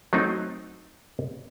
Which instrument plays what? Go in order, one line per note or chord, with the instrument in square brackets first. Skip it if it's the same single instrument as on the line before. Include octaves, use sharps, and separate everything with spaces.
[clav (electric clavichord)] F#3 A3 C4 D#4